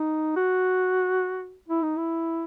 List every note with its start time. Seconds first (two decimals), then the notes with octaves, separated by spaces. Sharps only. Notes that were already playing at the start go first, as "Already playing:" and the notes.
Already playing: D#4
0.36 F#4
1.68 E4
1.82 D#4
1.97 E4